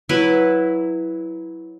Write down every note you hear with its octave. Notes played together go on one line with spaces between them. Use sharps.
F#3 E4 B4